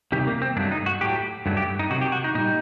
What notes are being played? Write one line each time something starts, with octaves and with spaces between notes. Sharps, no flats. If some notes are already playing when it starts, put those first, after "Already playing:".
C3 D#3 G3 G4
A#3
C4
G2 F#3 A3 D4
D#4
F#4
A2 F#3 A3 G4
G2 F#3 A3
G4
D#4
C3 D#3 F#3 F#4
G4
F#4
D#4
A#2 G3 D#4